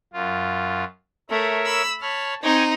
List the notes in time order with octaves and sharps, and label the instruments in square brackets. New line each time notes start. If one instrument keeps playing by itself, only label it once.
[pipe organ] F#2 F4
[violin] A3 [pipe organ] A#4 C#5 E5
[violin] B5 E6
[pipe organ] C#5 B5 F6 [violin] A5
[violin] C4 D#4 [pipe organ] G5 G#5 C#6